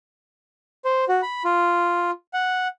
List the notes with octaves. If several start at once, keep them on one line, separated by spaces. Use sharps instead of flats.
C5
F#4
B5
F4
F#5